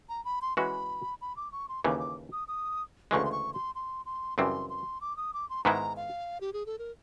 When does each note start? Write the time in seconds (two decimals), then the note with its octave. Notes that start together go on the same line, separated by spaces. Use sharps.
0.09 A#5
0.25 B5
0.42 C6
0.57 E3 G#3 C#4 F#4 B5
1.21 B5
1.37 D6
1.52 C#6
1.69 C6
1.84 D#2 C#3 E3 D6
2.00 D6
2.32 D#6
2.48 D#6
3.11 D2 C#3 E3 G#3 C#6
3.25 C6
3.32 C#6
3.54 C6
3.75 C6
4.06 C6
4.38 F#2 C#3 E3 G3 C4 C6
4.70 C6
5.01 D6
5.17 D#6
5.34 D6
5.50 C6
5.64 G#2 D#3 G#3 B3 E4 A#5
5.97 F5
6.41 G4
6.53 G#4
6.66 A4
6.79 A#4